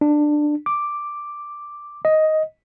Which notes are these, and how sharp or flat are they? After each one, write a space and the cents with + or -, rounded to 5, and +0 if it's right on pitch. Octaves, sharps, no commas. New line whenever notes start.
D4 +15
D6 +0
D#5 +10